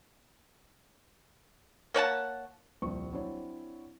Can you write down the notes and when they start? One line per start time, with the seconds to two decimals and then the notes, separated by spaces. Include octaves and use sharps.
1.94 A#3 C#5 F#5 A5
2.82 D#1 C2 F3 C#6
3.13 F#3 C4 D4 E4 C#5